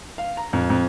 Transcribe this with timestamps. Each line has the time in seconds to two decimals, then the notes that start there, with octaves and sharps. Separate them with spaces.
0.18 F5
0.37 A#5
0.53 F2
0.70 F2